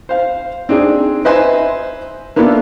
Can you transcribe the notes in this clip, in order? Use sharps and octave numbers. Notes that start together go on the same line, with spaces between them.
C5 F5
C4 D4 D#4 G#4
B4 C5 D#5 E5 G#5 C6
A#3 B3 D4 E4 F4 A4